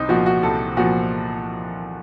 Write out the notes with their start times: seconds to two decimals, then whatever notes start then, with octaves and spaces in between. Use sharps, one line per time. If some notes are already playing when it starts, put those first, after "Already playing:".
Already playing: C2 C4 D#4
0.09 A#2 F3 F#4
0.26 F#4
0.43 C2 A4
0.77 A#2 F3 F#4